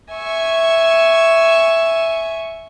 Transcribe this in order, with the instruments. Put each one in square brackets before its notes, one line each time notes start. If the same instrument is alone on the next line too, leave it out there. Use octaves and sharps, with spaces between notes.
[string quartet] E5 G#5 C#6